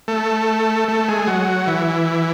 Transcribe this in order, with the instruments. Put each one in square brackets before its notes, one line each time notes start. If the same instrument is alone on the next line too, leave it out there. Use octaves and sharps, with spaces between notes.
[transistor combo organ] A3
A3
G#3
F#3
E3